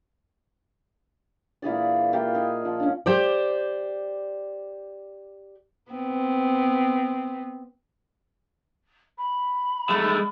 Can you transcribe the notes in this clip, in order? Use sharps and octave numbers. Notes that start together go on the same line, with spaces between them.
A#2 E3 G#4 D5
A#3 E4 F4 G4
D#5 G#5
F3
C#4 D4
G4 C5 D5
B3 C4
B5
G#3 A3